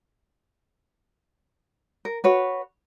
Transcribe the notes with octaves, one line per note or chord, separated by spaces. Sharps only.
A#4
F#4 B4 C#5